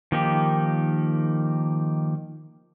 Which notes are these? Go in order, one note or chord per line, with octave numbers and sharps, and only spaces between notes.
D#3 F3 A#3 D#4 G4